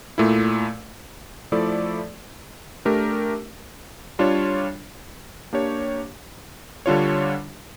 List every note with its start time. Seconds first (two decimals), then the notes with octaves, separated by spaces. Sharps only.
0.18 A#2 A3 E4
1.52 F3 A3 E4 A4 D5
2.85 A3 D4 G4 A#4
4.19 G3 D4 F4 C#5
5.53 A#3 D4 G4 C#5
6.86 D3 G3 D4 F4 C#5